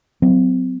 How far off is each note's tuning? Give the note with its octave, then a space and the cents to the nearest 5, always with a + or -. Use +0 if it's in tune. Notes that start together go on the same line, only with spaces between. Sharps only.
F#3 +0 C4 -30